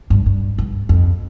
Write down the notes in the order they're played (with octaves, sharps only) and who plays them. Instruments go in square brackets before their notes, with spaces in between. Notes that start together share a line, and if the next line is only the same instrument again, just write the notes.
[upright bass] G2
G2
G2
F2